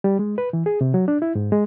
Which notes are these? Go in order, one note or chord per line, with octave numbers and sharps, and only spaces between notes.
G3
G#3
B4
E3
G#4
C3
F#3
D4
E4
G#2
G#3